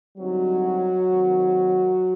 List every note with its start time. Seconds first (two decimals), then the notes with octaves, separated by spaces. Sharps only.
0.18 D3 F#3 G3 C4 D#4 F#4
1.09 D#2 D#3 G#3 C4